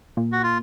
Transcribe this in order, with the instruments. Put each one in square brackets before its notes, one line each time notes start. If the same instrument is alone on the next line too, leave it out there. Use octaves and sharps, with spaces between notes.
[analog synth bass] A#2
[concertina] F#4
F4